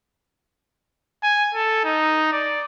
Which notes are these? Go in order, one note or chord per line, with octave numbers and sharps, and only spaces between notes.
G#5
A4
D#4
D5